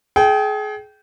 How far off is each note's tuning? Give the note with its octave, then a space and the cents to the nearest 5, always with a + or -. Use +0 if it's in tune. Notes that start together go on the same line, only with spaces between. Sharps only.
G#4 +30 G5 -15